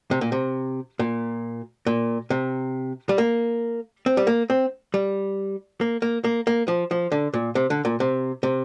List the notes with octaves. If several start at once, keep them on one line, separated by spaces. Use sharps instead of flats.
C3
A#2
C3
A#2
A#2
C3
G3
A#3
C4
G3
A#3
C4
G3
A#3
A#3
A#3
A#3
F3
F3
D3
A#2
C3
D3
A#2
C3
C3